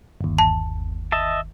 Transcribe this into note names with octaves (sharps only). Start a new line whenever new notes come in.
G1 D#2
A5
D#5 E5 A5